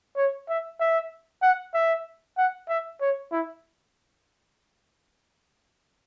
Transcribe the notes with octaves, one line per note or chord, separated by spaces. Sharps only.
C#5
E5
E5
F#5
E5
F#5
E5
C#5
E4